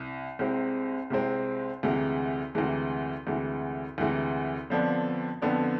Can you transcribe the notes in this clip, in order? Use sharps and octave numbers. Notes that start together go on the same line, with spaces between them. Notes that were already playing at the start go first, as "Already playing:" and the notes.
Already playing: C2
C2 C3 G#3 C4
C2 C3 G#3 C4
D2 C3 E3 G#3
D2 C3 E3 G#3
D2 C3 E3 G#3
D2 C3 E3 G#3
F2 D3 F3 B3 D4
F2 D3 F3 B3 D4